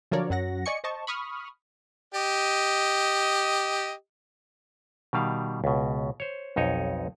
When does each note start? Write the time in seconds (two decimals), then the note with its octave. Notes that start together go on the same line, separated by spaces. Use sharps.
0.11 D3 F3 F#3 A#4 C#5 D5
0.30 F#2 F#3 F#5 A#6
0.66 D5 D#5 G#5 C#6 C#7
0.84 C5 D#5 A5 C#6
1.07 B5 C#6 D#6 F6
2.14 G4 D#5
5.13 B2 D#3 G3 F5
5.64 C#2 B2
6.20 C5 C#5
6.56 B1 F2 D#4 C#5 D#5